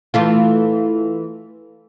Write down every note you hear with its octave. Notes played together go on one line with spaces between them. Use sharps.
E3 A3 F4